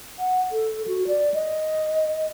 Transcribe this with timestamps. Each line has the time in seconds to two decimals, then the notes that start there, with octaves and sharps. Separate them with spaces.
0.19 F#5
0.52 A4
0.88 F#4
1.07 D5
1.34 D#5